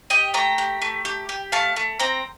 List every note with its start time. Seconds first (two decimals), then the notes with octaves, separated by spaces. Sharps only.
0.10 G4 D#5 G5
0.34 A3 G5 A#5
0.58 G4
0.82 A3
1.05 G4
1.29 G4
1.52 A3 F5 A5
1.76 A3
1.99 C4 G5 A#5